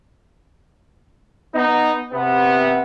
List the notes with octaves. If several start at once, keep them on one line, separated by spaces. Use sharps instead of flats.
B3 D#4
C3 B3